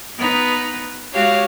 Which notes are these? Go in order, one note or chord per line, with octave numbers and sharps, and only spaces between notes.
B3 D#4 B4
G#3 F#4 G4 C#5 F5